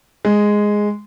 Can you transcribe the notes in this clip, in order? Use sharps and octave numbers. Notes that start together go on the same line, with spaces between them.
G#3